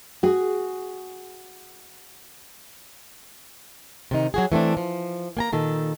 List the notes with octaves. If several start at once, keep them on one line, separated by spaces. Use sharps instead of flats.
F#4 G#4
C3 D#3 D#4
F#3 F#4 G#4
E3 A3 C4 D4
F3
A#3 G#5 A#5
A#2 D#3 A4